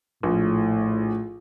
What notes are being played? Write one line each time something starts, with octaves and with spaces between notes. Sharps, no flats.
A#1 A2